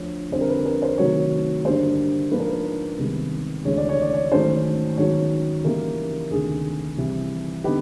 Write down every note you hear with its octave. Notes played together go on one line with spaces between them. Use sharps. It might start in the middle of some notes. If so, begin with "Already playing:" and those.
Already playing: D2 D3 F3 C#5
F2 D3 G3 C4 C5
A#4
B4
A#4
C5
C3 D#3 F#3 A3 C#5
G2 D3 G3 A#3 C5
G#2 F3 A#3 D4 B4
A#4
B4
C2 C3 D#3 G#3 B3
D2 C3 E3 G#3 C#4 C#5
D5
C#5
D5
C#5
G#2 D#3 F#3 A3 C#4 C5
G#2 D#3 F#3 B3 C#5
C#3 E3 G3 A#3 D#4 A#4
D2 C3 D#3 G#4
C2 C3 E3
D3 G3 B3 D#4 G4